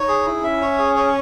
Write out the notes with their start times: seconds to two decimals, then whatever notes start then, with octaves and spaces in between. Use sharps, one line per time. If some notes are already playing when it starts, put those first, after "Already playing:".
Already playing: D#4 C#5
0.08 G#4
0.26 E4
0.44 C#4 E5
0.62 C#5
0.78 G#4
0.96 C#5